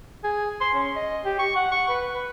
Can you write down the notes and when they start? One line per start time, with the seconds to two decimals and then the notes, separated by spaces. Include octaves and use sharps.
0.24 G#4
0.60 C6
0.75 C#4
0.96 D#5
1.24 G4
1.39 C#6
1.56 F#5
1.72 C#6
1.89 B4
2.13 B4